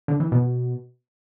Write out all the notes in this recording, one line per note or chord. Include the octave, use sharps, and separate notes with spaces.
D3
E3
B2